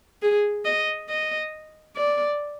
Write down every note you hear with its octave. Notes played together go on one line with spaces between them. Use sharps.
G#4
D#5
D#5
D5